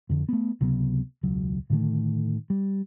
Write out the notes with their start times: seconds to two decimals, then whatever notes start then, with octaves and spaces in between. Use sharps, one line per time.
0.09 F2 D3
0.29 A3 B3
0.61 C#2 C3 F#3 B3
1.23 E1 C#2 F#3
1.70 A2 D3 D#3 A3
2.50 G3